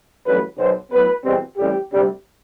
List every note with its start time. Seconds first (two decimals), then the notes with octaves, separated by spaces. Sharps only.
0.25 A1 G2 F#3 A3 B4
0.58 B1 B2 F#3 C5
0.91 A2 F#3 B3 B4
1.24 E2 B2 G3 C4
1.57 A1 A2 G3 C4 G4
1.90 D2 C3 G3